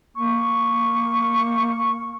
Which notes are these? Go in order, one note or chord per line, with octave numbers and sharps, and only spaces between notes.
A#3 C#6